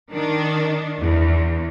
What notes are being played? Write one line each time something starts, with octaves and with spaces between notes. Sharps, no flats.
D#3 D4
E2